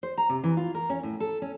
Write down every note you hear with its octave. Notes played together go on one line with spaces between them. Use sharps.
C5
A#5
C3
E3
F4
A#4
C#4
A2
A4
C#4